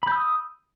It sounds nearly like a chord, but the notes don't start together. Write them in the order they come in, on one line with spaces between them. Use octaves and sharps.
B5 G6 E6 D#6